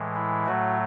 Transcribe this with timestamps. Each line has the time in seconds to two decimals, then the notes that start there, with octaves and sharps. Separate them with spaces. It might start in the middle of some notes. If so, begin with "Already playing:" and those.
Already playing: A2 E3 G#3
0.16 E4
0.46 A2 F#3 A3 F#4